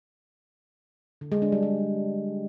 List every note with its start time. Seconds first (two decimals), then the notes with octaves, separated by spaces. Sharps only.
1.21 D3
1.32 G#3
1.42 D4
1.52 G3
1.63 G4